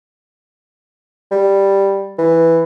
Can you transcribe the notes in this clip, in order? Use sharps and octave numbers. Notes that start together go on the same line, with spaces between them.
G3
E3